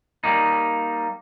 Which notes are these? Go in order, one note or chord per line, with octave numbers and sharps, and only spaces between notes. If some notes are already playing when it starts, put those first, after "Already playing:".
G3 A#3 D#4